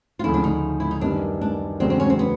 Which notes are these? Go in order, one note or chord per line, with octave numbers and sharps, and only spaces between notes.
F4
D2 C#3 F3 A3 C#4 E4
D4
D#4
E4
D#4
F#2 D#3 G3 B3 D4
D4
E2 C#3 F#3 A3 C4 D4
C4
C#4
C4
B3